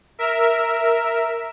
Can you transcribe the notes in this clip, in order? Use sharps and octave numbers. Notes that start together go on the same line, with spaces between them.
A#4 E5